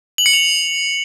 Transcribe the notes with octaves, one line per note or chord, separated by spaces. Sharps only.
F#7
C#7
F7